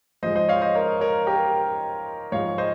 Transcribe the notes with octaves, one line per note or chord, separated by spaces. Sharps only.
G#2 F3 G#3 C5 D#5
C5 D#5
C#5 F5
C5 D#5
A#4 C#5
A#4 C#5
G4 A#4
G#2 F3 G#3 C#5 F5
C5 D#5